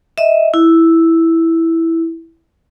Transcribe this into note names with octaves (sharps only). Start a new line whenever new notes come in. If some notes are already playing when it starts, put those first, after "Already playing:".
D#5 E5
E4